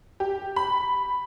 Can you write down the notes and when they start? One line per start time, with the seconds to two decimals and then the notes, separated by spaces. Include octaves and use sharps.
0.20 G4
0.56 B5